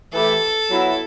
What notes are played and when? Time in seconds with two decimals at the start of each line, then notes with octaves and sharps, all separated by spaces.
0.13 E3 A3 E4 G4 A4
0.71 F#3 B3 E4